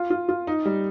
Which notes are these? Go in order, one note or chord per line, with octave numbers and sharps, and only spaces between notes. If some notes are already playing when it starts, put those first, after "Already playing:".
Already playing: F4
F4
F4
D#4
G3